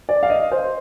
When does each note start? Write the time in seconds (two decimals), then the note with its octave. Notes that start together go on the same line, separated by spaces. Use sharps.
0.09 D5
0.23 F5
0.30 D#5
0.52 C5